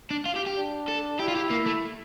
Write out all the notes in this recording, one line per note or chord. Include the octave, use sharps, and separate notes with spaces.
D4
F4
G4
G4
D4
A4
E4 G4
F4
G4
A#3
A3